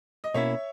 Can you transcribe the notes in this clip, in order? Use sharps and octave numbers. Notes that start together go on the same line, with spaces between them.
D#5
B2 A#3 C#4 E4 C#5 E5